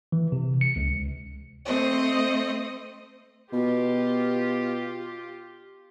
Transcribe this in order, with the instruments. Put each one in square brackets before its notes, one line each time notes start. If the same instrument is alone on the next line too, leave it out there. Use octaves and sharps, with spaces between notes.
[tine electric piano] E3
C3
C#7
C#2
[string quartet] A3 C4 C5 D#5
[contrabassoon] B2 [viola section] F4 G4